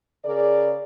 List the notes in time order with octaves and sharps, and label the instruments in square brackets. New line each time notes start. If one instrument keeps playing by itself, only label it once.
[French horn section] C#3 G#4 A#4 D5